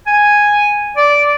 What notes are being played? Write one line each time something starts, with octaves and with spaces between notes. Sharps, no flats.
G#5
D5